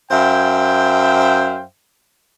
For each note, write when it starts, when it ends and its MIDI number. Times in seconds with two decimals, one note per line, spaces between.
0.11 1.63 42
0.11 1.63 72
0.11 1.63 76
0.11 1.63 77
0.11 1.63 79